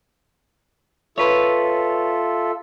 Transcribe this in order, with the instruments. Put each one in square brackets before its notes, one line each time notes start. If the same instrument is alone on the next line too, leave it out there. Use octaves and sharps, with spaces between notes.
[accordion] F4 A4 E5 [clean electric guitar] B4 C#5